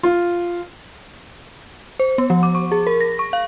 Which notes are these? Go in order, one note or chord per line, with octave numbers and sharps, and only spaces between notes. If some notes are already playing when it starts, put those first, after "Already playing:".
F4
C5
B3
F3
D6
C#6
G#4
A#4
A#6
C#6
F5